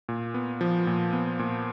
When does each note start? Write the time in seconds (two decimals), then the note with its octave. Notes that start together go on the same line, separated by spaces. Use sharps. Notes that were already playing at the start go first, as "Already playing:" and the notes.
0.09 A#2
0.34 B3
0.61 F3
0.87 A#2
1.13 B3
1.39 A#2